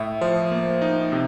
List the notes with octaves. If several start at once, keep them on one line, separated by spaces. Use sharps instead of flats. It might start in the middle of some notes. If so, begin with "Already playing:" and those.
Already playing: A2 E5
F3 C5
A#3
D#4
C3